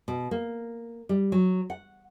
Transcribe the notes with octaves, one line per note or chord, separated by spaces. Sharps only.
B2
A#3
G3
F#3
F#5